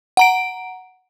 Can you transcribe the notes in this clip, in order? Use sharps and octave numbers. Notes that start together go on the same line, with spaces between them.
F#5 A#5 D7